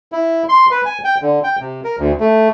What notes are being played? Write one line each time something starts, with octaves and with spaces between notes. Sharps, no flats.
E4
C6
B4
G#5
G5
D3
G5
C3
A#4
D2
A3